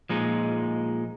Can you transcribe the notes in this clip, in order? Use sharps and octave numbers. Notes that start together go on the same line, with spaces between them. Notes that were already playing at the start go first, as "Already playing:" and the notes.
A#2 F3 G#3 D#4